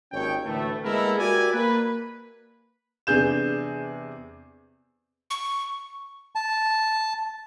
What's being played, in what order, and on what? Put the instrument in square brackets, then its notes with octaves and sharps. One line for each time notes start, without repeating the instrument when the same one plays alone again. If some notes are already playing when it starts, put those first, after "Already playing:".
[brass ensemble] G#1 D#2 C#4 C#5 G5
D2 A2 E3 A3
G#3 A#3 B3 E4 A4 A#4
F#4 G4 A#4 D5 E5 G#5
A#3 B4
[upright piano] E2 C3 D4 G#4 G6 E7
[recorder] C#6
[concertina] A5